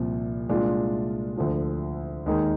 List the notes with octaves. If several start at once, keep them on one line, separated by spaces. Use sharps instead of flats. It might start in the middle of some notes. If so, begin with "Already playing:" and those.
Already playing: C2 A#2 F3 C4
C2 A#2 G#3 D4 F4
D2 D3 F3
D#2 D#3 G#3 D#4 G#4